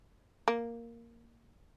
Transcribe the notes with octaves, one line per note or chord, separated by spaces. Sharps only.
A#3